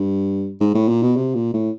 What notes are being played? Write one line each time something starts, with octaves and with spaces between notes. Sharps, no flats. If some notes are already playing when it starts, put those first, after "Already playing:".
Already playing: G2
G#2
A2
A#2
B2
C3
A#2
A2